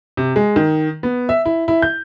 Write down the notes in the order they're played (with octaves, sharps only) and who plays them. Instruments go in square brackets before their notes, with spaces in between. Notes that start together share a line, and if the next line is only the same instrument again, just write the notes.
[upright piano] C3
G#3
D#3
B3
E5
E4
E4
G6